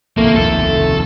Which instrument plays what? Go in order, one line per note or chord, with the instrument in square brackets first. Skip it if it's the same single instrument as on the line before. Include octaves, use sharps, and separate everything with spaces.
[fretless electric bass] B1 [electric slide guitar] C3 D#3 F3 [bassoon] A3 [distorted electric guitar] A#3
[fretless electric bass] D#1 C2 F2 [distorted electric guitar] A4